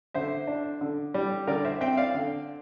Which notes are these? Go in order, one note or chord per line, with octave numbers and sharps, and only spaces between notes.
D3 C5 E5
D4
D3
G3
D3 A#4 D5
C5 E5
C4 E5 G5
D5 F5
D3